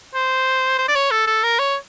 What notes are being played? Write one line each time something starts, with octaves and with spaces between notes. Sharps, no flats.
C5
C5
D5
C#5
A4
A4
A#4
C#5